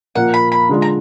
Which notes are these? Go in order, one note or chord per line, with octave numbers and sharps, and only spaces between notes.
A#2 F3 A#3 F#5
B5
B5
D3 G#3 D4 F4
A#5